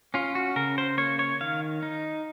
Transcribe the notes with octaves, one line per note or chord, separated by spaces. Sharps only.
C#4 F4
F#4
C#3 A#4
C5
A#3 C#5
C#5
D#3 F5
D#4